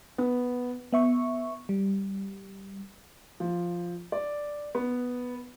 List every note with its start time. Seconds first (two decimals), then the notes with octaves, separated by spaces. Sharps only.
0.18 B3
0.93 B3 E5 C#6
1.69 G3
3.40 F3
4.12 D5
4.75 B3